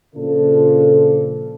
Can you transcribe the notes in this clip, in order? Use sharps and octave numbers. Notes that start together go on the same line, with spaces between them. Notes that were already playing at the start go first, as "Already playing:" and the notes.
A#2 C#3 F3 D4 F4 A4